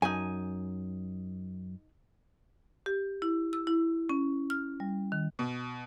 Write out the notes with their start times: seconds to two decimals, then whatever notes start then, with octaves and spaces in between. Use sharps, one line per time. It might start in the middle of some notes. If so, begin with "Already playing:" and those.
0.02 F#2 D#4 G#5
2.86 G4
3.22 E4
3.53 E6
3.67 E4
4.09 C#4
4.50 F6
4.80 G3
5.12 D#3
5.39 B2